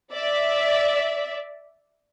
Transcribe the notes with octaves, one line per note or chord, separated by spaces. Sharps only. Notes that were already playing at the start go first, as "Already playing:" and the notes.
D5 E5